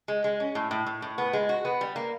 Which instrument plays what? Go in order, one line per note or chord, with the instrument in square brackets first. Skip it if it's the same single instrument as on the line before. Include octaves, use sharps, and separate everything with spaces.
[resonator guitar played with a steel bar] G#3
G#3
C#4
A2
A2
A2
A2
B3
G#3
F#4
B3
G3
A#3